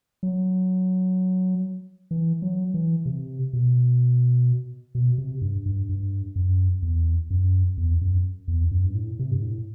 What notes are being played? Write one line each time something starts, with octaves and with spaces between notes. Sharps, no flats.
F#3
E3
F#3
E3
C3
B2
B2
C3
G2
G2
G2
F#2
E2
F#2
E2
F#2
E2
F#2
G2
A2
C3
G2
A2